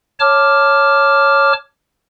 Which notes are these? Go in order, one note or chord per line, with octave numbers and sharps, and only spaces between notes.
C#5 A5 D6 F6